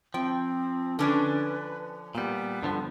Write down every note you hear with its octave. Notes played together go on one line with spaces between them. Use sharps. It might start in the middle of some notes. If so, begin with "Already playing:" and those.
F3 C4 G5
D3 C#4 D4 B4
A#2 G3 B3
G2 D3 F3